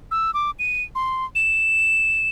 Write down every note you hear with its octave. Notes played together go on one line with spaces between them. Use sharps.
E6
D6
D#7
C6
E7